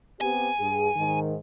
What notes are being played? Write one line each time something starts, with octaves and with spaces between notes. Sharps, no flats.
B3 C4 G4 G#5
G2 G#4
G#2 D#3